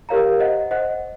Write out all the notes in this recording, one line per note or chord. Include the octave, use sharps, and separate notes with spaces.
G4 A#4 C#5 F5 A#5
C5 D#5 F#5
C5 D#5 F#5